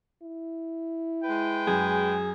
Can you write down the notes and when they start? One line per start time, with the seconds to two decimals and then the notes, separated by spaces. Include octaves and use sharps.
0.23 E4
1.24 G#3 B4 G5
1.67 F#2 G#4